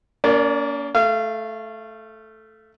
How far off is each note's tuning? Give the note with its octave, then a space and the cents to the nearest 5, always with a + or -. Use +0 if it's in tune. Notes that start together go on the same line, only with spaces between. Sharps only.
A#3 +0 C#4 +45 D5 +0
A3 -5 F5 -30